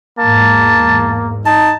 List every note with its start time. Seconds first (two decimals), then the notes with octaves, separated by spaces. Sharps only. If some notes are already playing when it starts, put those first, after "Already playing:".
0.19 E2 G#2 A#3 A5
1.46 D#4 A5